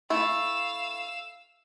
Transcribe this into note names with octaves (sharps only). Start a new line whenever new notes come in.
A3 E4 F5 E6